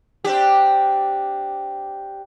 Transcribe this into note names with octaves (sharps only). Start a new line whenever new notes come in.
C4 D4 G4